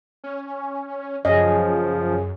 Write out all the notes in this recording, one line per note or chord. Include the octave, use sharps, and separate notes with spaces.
C#4
F#2 F3 C#4 G#4 D#5